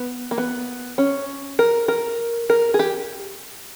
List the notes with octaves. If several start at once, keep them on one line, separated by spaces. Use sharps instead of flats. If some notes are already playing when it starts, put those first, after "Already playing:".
Already playing: B3
A#3
B3
C#4
A#4
A#4
A#4
G#4
G4